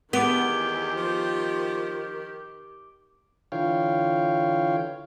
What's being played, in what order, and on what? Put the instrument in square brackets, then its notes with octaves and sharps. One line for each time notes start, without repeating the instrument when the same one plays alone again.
[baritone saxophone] E2 [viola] D#3 G4 [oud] B3 [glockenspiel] D6 D7 G7
[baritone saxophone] F3
[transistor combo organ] D3 E3 F4 C#5 F5 G5